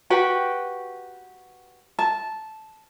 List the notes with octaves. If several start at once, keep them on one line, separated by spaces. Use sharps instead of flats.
F#4 G4 B4 G5
A5